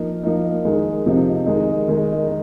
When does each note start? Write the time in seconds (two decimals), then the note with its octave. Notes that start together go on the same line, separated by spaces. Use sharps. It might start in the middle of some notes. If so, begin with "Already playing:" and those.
Already playing: F3 A#3 D#4
0.23 F3 A#3 D#4
0.65 D#3 G#3 D#4
1.06 C3 F3 C4 D#4
1.46 D#3 G#3 D#4
1.88 D#3 G#3 D#4
2.28 D#3